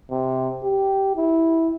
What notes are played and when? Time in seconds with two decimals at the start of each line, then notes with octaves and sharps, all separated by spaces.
0.11 C3
0.64 G4
1.16 E4